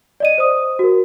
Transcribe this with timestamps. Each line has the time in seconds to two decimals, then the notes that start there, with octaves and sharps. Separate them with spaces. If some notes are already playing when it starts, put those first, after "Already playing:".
0.20 D5 D#5 D#7
0.38 C5 D#6
0.79 F#4 A#4